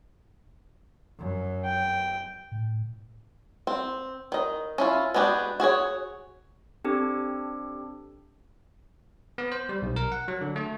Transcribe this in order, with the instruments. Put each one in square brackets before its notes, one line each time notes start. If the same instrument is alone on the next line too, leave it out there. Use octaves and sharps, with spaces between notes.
[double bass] F#2
[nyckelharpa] G5
[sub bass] A2
[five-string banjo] C4
D#3 D#5
C#4 E4 F4
G#3 B3 D4 F#4 G4
F#4 G#4 A#4 C#5
[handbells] C4 D4 G4 A4
[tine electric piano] B3
C5
G3
B1
A#4
F#5
F#3
D3
A3